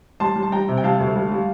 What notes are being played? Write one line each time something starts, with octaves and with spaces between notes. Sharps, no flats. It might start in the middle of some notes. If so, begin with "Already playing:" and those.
G3 A5 C6
G3
A5
G3 G5 A#5
C3
G5
G3 F5 A5
D2
G3
G3